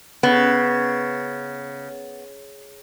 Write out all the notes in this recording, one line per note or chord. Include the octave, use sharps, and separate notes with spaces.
C#3 B3